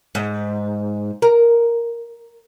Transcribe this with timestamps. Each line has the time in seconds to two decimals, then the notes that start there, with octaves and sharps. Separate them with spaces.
0.15 G#2
1.22 A#4